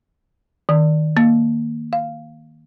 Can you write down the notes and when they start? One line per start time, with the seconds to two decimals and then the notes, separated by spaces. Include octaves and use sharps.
0.69 D#3
1.17 A#3
1.93 F5